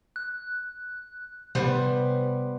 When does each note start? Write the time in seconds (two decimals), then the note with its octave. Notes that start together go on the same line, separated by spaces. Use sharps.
0.16 F#6
1.55 C3 G3 B3 C5